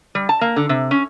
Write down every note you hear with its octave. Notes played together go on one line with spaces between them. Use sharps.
G3
A5
A#3
D3
C3
C#4